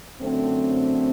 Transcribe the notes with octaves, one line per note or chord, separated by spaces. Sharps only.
F#2 D3 A3 C4